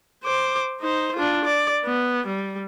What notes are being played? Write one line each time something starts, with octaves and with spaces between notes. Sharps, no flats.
C5 D6
D#4 C5
D4 F4
D5
B3
G3